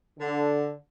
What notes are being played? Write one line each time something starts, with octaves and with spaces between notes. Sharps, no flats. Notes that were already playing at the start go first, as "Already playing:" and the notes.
D3